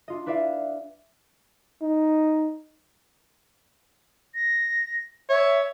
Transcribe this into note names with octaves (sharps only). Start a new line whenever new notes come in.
D4 F4 D#5
E4 B4 D5 E5 F5
D#4
A#6
C#5 E5